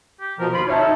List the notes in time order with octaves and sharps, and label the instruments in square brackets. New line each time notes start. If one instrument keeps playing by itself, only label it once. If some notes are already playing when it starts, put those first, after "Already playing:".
[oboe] G4
[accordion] B2 F3 [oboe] A#4
[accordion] D#2 B5 [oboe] F4
[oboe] C#4 [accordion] D#4 [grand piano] C#5 E5 A5
[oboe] A4